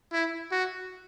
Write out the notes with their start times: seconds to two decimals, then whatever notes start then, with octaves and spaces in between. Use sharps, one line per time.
0.12 E4
0.52 F#4